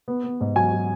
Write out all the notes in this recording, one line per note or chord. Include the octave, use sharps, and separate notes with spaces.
B3
B3
G#2
F#3 G#5
F#3